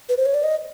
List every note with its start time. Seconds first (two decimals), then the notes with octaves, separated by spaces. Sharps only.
0.09 B4
0.17 C5
0.26 C#5
0.34 D5
0.43 D#5